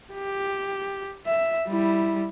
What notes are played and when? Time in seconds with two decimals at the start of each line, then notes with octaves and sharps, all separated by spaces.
0.14 G4
1.26 E5
1.68 G3 E4